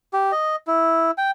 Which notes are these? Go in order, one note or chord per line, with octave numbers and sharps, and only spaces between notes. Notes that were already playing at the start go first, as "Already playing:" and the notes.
G4
D#5
E4
G5